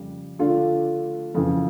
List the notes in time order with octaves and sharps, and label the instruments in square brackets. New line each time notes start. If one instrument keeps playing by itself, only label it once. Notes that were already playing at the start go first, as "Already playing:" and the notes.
Already playing: [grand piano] F2 C#3 G3
D3 A3 D4 F4
F2 C#3 E3